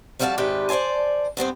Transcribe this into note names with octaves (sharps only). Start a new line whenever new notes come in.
F2 G3 F#4 G#4 F5 A5
G#2 C3 D#3 D4 G4 B4
C5 D5 E5 G#5 A5
G2 B3 C4 C5